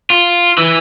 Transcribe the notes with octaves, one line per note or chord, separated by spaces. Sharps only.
F4
E3